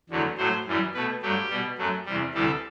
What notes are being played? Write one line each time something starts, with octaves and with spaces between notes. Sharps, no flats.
E2 D3 F#3 A3
A2 F#3 A3 C5
F#2 E3 G3
B2 A3 B4
G2 F#3 A3 G4
B2 G3
F#2 F#3 A3
E2 C3 G3
D2 C3 E3 G3 A4